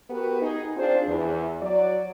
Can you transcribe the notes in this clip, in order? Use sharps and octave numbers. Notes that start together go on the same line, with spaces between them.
B3 F#4 G4 A#4 B4
D#4 G#4
C4 D4 F4 G#4 C5
E2
F#3 D5